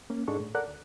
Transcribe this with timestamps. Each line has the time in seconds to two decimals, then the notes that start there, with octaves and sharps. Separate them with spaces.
0.10 A#3 C#4
0.28 G#2 G#3 D4 A4 C#6
0.40 A2
0.55 A4 A#4 D5 F#5 F#6
0.67 D2